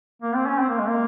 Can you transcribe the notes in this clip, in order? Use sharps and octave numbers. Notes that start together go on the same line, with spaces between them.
A#3
C4
C#4
C4
A#3
G#3
A#3